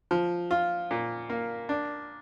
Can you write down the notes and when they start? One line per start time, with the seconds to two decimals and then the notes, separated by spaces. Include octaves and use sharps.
0.11 F3
0.51 F4
0.91 A#2
1.30 A#3
1.69 D4